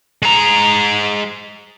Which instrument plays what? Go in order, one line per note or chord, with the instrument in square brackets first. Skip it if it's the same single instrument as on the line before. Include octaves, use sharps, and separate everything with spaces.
[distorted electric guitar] G#3 A#5